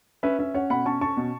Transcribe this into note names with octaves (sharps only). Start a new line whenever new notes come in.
C#4 B4 E5
C#4 B4 E5
C#4 C#5 F#5
B2 F#5 B5
C#4 A5 C#6
C#4 A5 C#6
B2